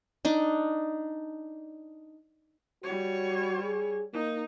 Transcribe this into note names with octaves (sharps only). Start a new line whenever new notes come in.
D4 D#4
G3 F#4 C#5
G#4
A#3 D#4